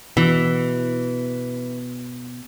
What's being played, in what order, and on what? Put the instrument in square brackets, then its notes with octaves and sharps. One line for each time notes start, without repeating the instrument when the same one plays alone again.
[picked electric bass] B2 [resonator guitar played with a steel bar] E3